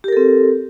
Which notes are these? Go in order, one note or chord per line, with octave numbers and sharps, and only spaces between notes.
C4 G4 A4 A#4